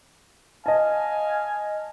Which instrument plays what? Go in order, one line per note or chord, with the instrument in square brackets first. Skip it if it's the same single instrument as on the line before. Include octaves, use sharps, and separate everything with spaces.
[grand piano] D#5 A5 [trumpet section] F5 G#5